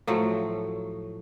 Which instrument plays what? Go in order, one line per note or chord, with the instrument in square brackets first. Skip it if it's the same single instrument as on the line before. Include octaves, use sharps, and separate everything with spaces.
[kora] A2 F3 F#3 A3